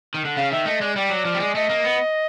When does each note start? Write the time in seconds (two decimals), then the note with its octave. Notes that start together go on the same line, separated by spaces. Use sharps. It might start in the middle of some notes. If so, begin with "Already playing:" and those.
0.14 D#3
0.25 D3
0.37 C#3 F5
0.51 D#3 E5
0.66 A3 D#5
0.81 G#3 D5
0.96 G3 D5
1.10 F#3
1.25 F3
1.34 G3
1.40 G#3
1.55 A3 D#5
1.70 A#3
1.84 B3